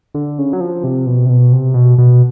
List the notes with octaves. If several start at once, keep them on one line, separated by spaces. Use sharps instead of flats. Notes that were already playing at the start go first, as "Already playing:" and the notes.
D3
C#3
F#3
F3
C3
B2
C3
B2
C3
B2
B2